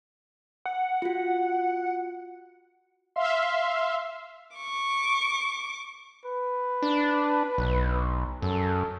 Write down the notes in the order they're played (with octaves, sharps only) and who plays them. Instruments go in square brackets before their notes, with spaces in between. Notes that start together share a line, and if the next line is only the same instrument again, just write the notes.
[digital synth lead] F#5
[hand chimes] F4 F#4
[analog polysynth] E5 F5 C6
[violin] C#6 D6
[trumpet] B4
[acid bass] D4
B1
[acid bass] F#2 [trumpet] A4